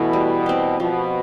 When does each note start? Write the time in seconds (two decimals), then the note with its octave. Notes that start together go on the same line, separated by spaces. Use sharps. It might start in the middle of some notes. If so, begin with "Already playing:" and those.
Already playing: B2 E3 A3 E4
0.13 G3
0.46 C4 G4
0.80 B2 F3